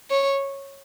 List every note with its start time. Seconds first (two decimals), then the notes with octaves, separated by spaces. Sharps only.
0.10 C#5